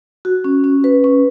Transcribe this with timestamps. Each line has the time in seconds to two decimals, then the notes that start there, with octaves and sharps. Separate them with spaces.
0.25 F#4
0.44 C#4
0.64 C#4
0.84 B4
1.04 C#4